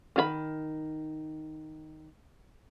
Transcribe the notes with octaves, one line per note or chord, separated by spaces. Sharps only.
D#3 F4 B5